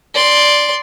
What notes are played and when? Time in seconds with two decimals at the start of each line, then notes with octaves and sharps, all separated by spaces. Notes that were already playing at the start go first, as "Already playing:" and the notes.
0.14 D5 C6